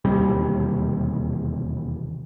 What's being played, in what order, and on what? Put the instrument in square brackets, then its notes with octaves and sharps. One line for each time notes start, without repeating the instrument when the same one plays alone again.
[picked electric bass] E1 D#2 C3 G3